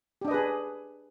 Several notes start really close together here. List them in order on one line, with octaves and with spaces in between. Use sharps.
G4 D4 D#5 B4 G#4